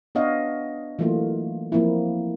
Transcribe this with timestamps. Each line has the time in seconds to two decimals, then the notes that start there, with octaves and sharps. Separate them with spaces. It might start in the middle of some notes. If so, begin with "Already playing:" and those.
0.15 B3 D4 C#5 D#5 F5 F#5
0.99 E3 F#3 A3 A#3 F4
1.72 F3 A#3 C4 E4